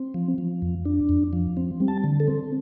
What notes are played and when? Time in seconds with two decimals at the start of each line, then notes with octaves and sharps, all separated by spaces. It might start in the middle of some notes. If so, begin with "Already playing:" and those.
Already playing: C4
0.14 F3
0.38 F3
0.62 F2
0.85 D4
1.09 F2
1.33 F3
1.57 C4
1.80 G3
1.88 A5
2.04 D3
2.20 A4
2.27 C4